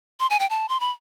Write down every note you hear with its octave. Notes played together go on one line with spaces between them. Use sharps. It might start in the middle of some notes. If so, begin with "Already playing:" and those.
C6
G#5
G5
A5
C6
B5